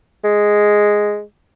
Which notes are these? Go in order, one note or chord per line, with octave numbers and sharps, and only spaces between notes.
G#3